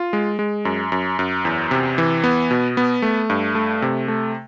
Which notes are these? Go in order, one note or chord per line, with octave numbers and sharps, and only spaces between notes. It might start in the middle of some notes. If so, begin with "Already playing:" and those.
Already playing: F4
G#3
G#3
F#2
F#2
F#2
E2
C3
E3
B3
B2
B3
A3
G2
A3
C3
A3